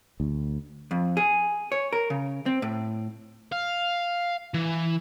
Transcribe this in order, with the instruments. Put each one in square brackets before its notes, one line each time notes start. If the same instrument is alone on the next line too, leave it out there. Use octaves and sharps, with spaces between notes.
[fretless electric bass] D2
[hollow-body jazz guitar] F2
G#4
C#5
A#4
C#3
C4
A2
[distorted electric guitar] F5
E3